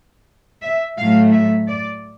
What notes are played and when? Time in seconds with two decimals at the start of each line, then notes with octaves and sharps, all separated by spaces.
0.62 E5
0.97 A2 F#3 A3 F5
1.32 E5
1.67 D5